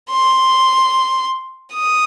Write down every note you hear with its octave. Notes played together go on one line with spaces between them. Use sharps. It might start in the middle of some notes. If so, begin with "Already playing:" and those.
C6
D#6